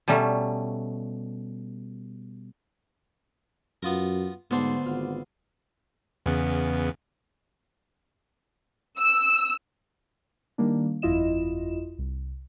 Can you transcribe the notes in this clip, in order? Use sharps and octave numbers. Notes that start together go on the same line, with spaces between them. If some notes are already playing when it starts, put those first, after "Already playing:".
B2 G3 A3 C#4 A#5
F#2 B3 F4 A#4
D2 G#2 B3 D4 C5
G#1 F4
E2 C#3 B3
E6
D#3 G3 A#3 D4
G1 F2 E4 F4 D#5 E7
C2